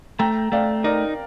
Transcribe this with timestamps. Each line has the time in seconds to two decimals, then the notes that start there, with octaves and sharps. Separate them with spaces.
0.19 A3 G5 A#5
0.52 A3 D5 F5
0.84 D#4 A#4 D5